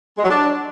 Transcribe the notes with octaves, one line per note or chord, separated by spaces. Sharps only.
G#3
F#3
D4